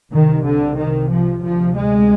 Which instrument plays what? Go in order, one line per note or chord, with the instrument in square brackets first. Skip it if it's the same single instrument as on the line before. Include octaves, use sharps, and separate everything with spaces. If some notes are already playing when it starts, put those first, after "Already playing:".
[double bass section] C2 C3 D#3
D3
D#3
F3
D2 C3 F3
G#3